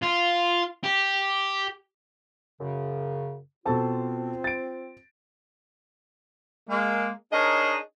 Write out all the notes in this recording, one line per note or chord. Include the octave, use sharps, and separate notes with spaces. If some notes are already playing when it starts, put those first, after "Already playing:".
F4
G4
F#2 C#3
B2 C4 F4 A4 A5
A6 D7
G#3 A#3
D4 D#4 G#4 A#4 C#5 D#5